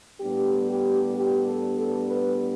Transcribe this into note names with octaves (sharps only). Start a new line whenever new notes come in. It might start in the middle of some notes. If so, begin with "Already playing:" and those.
A2 G3 B3 D4 G4
G4
G4
A4
A4
B4